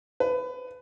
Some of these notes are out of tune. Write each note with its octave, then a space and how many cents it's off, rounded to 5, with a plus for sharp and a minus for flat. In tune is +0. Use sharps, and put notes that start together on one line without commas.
B4 +25